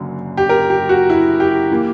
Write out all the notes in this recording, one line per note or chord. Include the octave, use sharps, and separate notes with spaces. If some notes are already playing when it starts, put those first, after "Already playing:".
Already playing: F#1 F#2 D3 F#3
G4
A#4
G4
F#4
E4
G4
E3 A#3